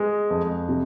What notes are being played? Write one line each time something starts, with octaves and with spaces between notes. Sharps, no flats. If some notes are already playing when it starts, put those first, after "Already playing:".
Already playing: G#3
F2
C3